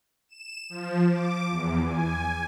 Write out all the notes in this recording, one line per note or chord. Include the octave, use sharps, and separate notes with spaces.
E7
F3
D6
E2
G#5